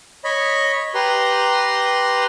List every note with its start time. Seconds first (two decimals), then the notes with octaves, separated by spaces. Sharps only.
0.24 C#5 D#5 B5
0.95 G4 B4 A#5 C6